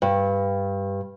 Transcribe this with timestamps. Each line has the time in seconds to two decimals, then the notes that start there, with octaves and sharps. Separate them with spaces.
0.02 G2